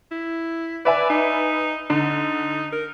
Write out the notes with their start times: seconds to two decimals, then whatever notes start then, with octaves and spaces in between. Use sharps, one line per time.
0.11 E4
0.85 B4 D5 E5 G#5
1.10 D#4
1.90 D3 D#4
2.72 A#4